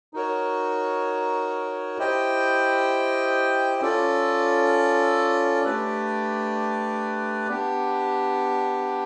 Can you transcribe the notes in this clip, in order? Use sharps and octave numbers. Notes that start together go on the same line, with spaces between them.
D#4 F#4 A#4 C#5
E4 G4 C5 D#5 G5
C#4 F4 A4 D5
A3 D4 G4 B4 D5
B3 D4 G4